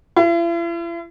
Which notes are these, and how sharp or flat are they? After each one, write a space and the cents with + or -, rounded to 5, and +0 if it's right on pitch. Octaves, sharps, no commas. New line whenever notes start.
E4 +45